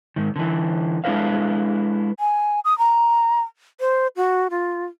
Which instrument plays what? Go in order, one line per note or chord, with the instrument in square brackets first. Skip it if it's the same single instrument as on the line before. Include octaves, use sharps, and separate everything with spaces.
[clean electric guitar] G#2 D#3
D3 E3
G#3 D4 E4 A4 B4 F5
[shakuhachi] G#5
D#6
A#5
C5
F#4
F4